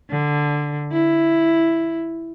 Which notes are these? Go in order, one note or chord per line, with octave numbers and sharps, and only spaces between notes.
D3
E4